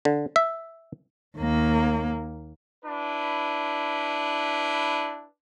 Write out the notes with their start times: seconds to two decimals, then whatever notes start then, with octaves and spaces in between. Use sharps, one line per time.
0.05 D3
0.36 E5
1.38 D#2 A#3
2.85 D4 E4 B4